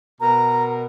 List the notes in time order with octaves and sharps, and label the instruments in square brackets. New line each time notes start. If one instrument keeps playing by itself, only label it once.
[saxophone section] B2 A#4 [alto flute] A#5